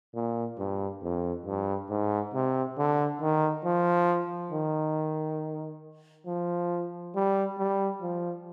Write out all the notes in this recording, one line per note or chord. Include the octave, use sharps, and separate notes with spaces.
A#2
G2
F2
G2
G#2
C3
D3
D#3
F3
D#3
F3
G3
G3
F3